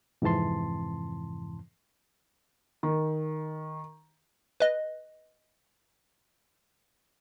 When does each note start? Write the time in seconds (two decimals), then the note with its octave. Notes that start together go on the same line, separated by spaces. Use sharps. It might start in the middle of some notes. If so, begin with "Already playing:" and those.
0.22 F2 G#2 C3 E3 A5 C6
2.83 D#3
4.60 B4 D#5